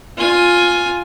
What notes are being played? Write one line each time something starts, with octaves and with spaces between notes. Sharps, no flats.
F4 G#5